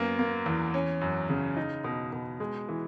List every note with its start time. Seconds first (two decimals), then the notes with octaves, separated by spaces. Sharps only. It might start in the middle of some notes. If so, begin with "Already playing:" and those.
Already playing: F#2 A#3 B3
0.19 A#3
0.46 E2
0.74 C#4
1.01 F#2
1.29 C#3
1.57 D#4
1.84 B2
2.13 B2
2.40 G#3
2.68 E3